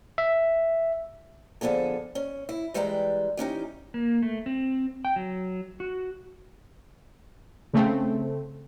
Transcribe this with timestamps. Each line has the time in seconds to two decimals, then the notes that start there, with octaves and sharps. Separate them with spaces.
0.18 E5
1.61 D3 F3 B3 G#4 A4
2.15 C#4
2.49 E4
2.74 E3 G3 G#3 B4 G5 A#5
3.37 E3 C#4 D#4 G4
3.94 A#3
4.22 A3
4.46 C4
5.05 G5
5.16 F#3
5.80 F#4
7.73 C#3 A3 C4